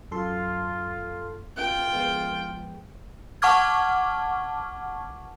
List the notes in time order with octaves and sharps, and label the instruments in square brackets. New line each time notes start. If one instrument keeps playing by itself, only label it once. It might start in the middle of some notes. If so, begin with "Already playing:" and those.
[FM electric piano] F#2 A4 C6 [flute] F4
[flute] F4 [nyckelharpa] G5
[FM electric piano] F3 G#3 B3
[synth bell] F#5 A5 C#6 D6 F6 G#6